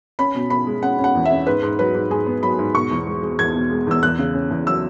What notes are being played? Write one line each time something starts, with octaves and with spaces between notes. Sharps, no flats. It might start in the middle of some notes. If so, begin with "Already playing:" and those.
C#4 B5
B2
B2 B5
G#3
C#4 F#5
C#4
F#5
E2
E5
C#4
G#2 B4
G#2
F#3 B4
G#2
G#2 G#4
B3
F#3 B5
G#2
B2 C#6
E2
G#3
G#3
E2 G#6
B2
G#3
E2 E6
E2 F#6
C#3
C#4
E2
F#3 E6